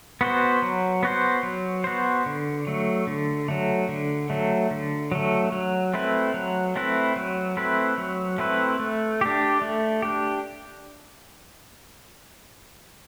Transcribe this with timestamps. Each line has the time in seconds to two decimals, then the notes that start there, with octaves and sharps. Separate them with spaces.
0.21 B3 F#4 C5
0.62 F#3
1.03 B3 F#4 C5
1.43 F#3
1.84 B3 F#4 C5
2.26 D3
2.67 F#3 A3
3.07 D3
3.49 F#3 A3
3.89 D3
4.30 F#3 A3
4.71 D3
5.12 F#3 A3
5.52 F#3
5.94 A3 C4 E4 B4
6.34 F#3
6.76 A3 C4 E4 B4
7.16 F#3
7.57 A3 C4 E4 B4
7.98 F#3
8.38 A3 C4 E4 B4
8.80 A3
9.21 D4 G4
9.62 A3
10.02 D4 G4